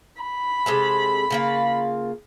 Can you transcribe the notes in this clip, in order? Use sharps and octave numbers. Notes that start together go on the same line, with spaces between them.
B5
C3 G#3 A4
C#3 A#3 F4